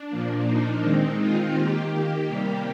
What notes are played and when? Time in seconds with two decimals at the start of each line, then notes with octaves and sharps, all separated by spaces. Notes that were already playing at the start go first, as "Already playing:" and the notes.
Already playing: D4
0.10 A#2 F3 A#3
0.46 D#4
0.82 D#3 G#3 C4 D#4
1.19 F4
1.55 D#3 A#3 G4
2.27 C3 G3 A#3 G4